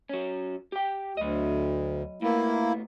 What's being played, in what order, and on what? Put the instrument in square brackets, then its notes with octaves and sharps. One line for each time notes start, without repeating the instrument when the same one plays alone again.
[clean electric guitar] F#3 C#4
G4 G5
[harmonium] D2 [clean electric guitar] F#3 D#5
[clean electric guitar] A2 B3 [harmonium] A#3 E4